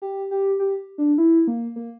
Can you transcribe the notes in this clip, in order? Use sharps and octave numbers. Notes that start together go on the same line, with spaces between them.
G4
G4
G4
D4
E4
A#3
A#3